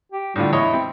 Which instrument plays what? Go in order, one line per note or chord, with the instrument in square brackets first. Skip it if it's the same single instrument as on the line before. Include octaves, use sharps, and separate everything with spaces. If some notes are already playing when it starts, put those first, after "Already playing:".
[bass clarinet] G4
[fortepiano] A2 D3 F4 [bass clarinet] G3
[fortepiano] E2 C#5 D#5 [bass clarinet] E4
[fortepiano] C4